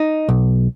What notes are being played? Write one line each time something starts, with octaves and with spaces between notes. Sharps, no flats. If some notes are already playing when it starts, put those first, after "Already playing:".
Already playing: D#4
B1